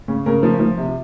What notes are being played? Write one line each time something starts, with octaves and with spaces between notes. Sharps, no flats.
C#3
C#3 A#4
F3
F3
C3